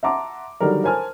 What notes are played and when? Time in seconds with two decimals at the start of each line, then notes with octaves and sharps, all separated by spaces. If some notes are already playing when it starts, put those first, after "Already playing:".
0.03 E5 F#5 A5 A#5 C6 D6
0.60 D3 D#3 F#3 G3 D#4 A#4
0.84 A#4 C5 G#5 A5 F6